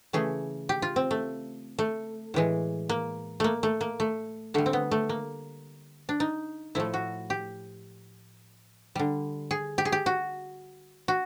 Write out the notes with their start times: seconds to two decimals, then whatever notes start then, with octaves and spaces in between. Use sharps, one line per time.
0.13 C#3 E3 A3 G#4
0.69 G4
0.82 F4
0.96 C4
1.11 A3
1.79 A3
2.34 A2 E3 G#3
2.89 A#3
3.40 A3 A#3
3.63 A3
3.81 A#3
4.00 A3
4.54 D3 G3 A3
4.66 C4
4.73 B3
4.91 A3
5.09 A#3
6.09 D4
6.20 D#4
6.75 A2 F3 A3 E4
6.94 F#4
7.30 G4
8.95 D3 G3
9.51 G#4
9.78 G4
9.85 G#4
9.92 G4
10.06 F#4
11.08 F#4